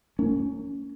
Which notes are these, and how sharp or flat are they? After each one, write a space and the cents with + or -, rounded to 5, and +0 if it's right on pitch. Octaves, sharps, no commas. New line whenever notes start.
A#3 -35 C#4 +15